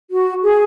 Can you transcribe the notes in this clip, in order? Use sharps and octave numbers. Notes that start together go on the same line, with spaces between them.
F#4
G#4